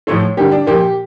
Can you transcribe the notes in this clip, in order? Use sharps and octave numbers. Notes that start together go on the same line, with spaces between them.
A2 F3 A3 C#5
D3 G3 A#3 G4
D4
A#2 F3 A#3 G4